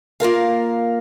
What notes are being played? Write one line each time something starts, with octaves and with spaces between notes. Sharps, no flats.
A#3 F4 A#4 F5